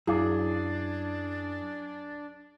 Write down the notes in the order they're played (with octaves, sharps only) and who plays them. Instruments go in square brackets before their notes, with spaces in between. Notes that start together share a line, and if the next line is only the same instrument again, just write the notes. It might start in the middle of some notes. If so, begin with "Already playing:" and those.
[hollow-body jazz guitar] F#2 [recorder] D4 [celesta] E4 F5 D6 [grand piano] G#4